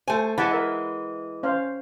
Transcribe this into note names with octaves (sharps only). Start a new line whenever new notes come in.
A3 C5 G#5
E3 G#3 F#5 A5 B5
A#4 E5
C#4 C5 F5